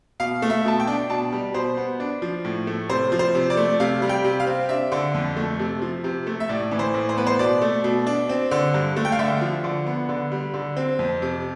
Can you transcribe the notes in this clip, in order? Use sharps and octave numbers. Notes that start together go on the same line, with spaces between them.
B2 F5
A3
E5
B2 A5
G5
D4
B2 A5
G3
B2 C5
B3
D4
F3
A2
A3
C3 C5
F3
C5
C3
D5
A3
C3 F5
G3
G5
C3
F5
C4
D4 E5
D3
F2
A3
C3
F3
C3
A3
E5
A2 D5
E3
C5
A2
C5
B3 B4
C5
B2 D5
A3
B2
D4
C4
D3
G2
A3
G5
F5
D3 E5
F3
D3
B3
D3
G3
D3
C4
F2
C3